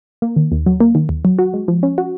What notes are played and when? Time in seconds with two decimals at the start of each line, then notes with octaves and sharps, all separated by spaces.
0.22 A#3
0.36 D#3
0.52 D#2
0.66 F#3
0.81 A#3
0.95 D#3
1.09 D#2
1.25 F#3
1.39 F#4
1.54 G#3
1.68 F3
1.83 C#4
1.98 F#4